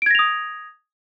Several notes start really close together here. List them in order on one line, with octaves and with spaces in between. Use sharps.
D7 G#6 A#6 F7 D#6